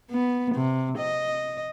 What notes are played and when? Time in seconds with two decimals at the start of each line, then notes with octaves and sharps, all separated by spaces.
0.11 B3
0.55 C3
0.99 D#5